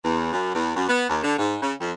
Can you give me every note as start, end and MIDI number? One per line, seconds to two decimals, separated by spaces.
0.02 0.31 40
0.32 0.50 42
0.54 0.72 40
0.76 0.86 42
0.88 1.06 59
1.09 1.21 39
1.22 1.32 50
1.37 1.55 44
1.62 1.73 49
1.80 1.91 41